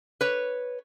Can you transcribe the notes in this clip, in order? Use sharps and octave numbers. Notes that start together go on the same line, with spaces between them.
B4 C#5